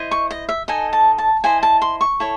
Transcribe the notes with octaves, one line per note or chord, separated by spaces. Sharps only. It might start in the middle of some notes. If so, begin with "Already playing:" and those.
Already playing: E4 C5 D#5
C#6
D#5
E5
D#4 A4 D#5 G#5
A5
A5
E4 C5 D#5 G#5
A5
C6
C#6
E4 A4 C#5